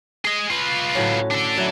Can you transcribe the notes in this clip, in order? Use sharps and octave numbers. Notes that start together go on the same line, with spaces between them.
G#4 D#5
F4 B4
A2 F#3 C#4
D4 A4
F#3 E4